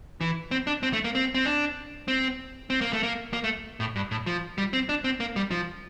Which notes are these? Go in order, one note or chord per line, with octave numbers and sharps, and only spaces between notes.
E3
C4
D4
C4
A3
A#3
C4
C4
D4
C4
C4
A#3
A3
A#3
A#3
A3
A2
G2
A2
F3
G3
C4
D4
C4
A#3
G3
F3